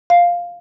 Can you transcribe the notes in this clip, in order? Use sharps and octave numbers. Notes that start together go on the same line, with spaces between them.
F5